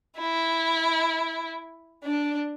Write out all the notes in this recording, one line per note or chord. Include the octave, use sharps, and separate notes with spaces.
E4
D4